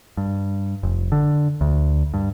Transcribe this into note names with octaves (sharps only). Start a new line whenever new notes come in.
G2
F1
D3
D2
G2